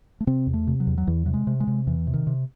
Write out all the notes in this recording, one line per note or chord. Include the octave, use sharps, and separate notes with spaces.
A3
C3 C4
E2
A3
C3
F#3
E2
F#3
E2 E3
C3 F#3
G#3
C3
G#3
C3
E2 E3
C3
D#3
C3